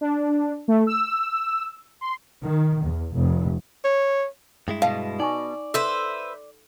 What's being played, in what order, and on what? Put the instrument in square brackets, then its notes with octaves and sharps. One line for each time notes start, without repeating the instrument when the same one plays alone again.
[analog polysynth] D4
A3
E6
C6
[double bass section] D#3
E2
F1
[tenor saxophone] C#5
[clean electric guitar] G2 G#3 E4
[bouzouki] B2 [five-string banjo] F5 [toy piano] A5
[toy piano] D#4 G#5 C#6 [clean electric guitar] D5
[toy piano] A4 [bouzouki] B4 C5 E5